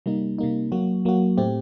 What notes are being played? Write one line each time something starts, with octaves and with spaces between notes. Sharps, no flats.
C3 G3 A#3 D#4
C3 G3 A#3 D#4
F#3 A#3 F#4
F#3 A#3 F#4
A2 A3 C4 G4